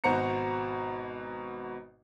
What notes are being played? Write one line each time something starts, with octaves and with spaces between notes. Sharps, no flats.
G#1 B2 F#4 C5 A#5 C#7